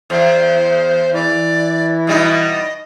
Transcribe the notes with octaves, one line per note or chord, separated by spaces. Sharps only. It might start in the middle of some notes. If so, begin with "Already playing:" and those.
E2 C5
E3 D5
B2 G3 D#4 D#5